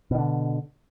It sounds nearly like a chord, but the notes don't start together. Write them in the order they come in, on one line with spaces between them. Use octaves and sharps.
B2 D#3 D3